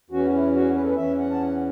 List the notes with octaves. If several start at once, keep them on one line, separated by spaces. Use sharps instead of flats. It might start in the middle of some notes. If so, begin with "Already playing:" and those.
E2 E3 C#4 F#4
E4
F#4
B4
A4
B4
E2 E3 C#4 E5
F#5
A5
F#5